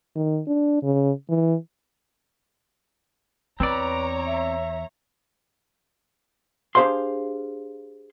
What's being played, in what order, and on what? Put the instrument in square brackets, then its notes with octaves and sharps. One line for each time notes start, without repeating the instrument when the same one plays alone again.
[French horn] D#3
D4
C#3
E3
[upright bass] E2 [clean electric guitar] C4 D5 [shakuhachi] B4 [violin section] C#5 A#5
[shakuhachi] E5
[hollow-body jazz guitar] D4 G4 G#4 C5 F5 C6